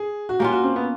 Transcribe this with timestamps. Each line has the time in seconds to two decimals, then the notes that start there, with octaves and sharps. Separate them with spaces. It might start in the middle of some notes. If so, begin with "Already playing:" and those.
Already playing: G#4
0.29 F#4
0.39 A#3 C#4 F4 G4
0.52 F#4
0.63 C4
0.76 B3